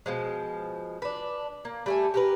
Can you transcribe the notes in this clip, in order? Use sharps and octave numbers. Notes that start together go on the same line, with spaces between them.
B2 F3 G#3
D4 B4
A#3
G3 A3 G#5
G4 A#4 B4